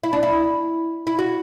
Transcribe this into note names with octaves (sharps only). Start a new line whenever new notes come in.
E4
D4
E4
E4
F#4